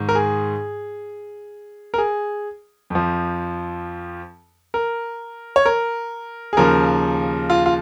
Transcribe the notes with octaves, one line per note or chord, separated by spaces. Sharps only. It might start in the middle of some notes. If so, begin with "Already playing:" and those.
Already playing: G#2 D#3
A#4
G#4
A#4
G#4
F2 F3
A#4
C#5
A#4
G#4
D#2 C#3 F3 A#4
F4
F4